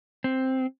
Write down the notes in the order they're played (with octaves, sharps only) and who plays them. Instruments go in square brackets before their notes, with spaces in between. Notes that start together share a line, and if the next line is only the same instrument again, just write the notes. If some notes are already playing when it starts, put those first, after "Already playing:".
[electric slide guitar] C4